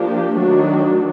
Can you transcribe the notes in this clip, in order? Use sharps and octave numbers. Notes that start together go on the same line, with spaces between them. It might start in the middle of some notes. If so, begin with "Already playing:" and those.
Already playing: F3 A#3 D4 G4
D#3 F#3 A3 D4 F#4